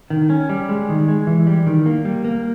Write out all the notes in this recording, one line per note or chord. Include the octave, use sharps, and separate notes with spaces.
D#3
C#4
G3
G#3
D#3
G#3
E3
G3
D#3
A#3
G3
A#3